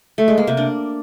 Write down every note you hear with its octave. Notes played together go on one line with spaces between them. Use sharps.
A3
G#3
A#3
C3
D4